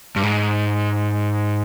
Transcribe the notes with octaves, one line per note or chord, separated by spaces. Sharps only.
G2
G#2